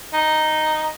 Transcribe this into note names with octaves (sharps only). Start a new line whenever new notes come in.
D#4